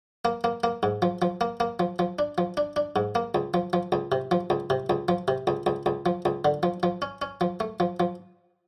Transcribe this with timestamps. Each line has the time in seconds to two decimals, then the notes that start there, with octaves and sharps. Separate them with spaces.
0.25 A#3
0.44 A#3
0.64 A#3
0.83 G#2
1.02 F3
1.22 F3
1.41 A#3
1.60 A#3
1.80 F3
1.99 F3
2.19 D4
2.38 F3
2.57 D4
2.76 D4
2.96 G#2
3.15 A#3
3.35 C#2
3.54 F3
3.73 F3
3.92 C#2
4.12 C3
4.31 F3
4.50 C#2
4.70 C3
4.90 C#2
5.08 F3
5.28 C3
5.47 C#2
5.66 C#2
5.86 C#2
6.06 F3
6.25 C#2
6.45 D3
6.63 F3
6.83 F3
7.02 C#4
7.22 C#4
7.41 F3
7.60 A3
7.80 F3
8.00 F3